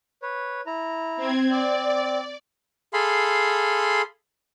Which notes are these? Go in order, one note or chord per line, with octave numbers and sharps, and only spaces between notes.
B4 C#5
E4 A#5
C4 G#6
C4 D5
G#4 A4 F5 B5 C6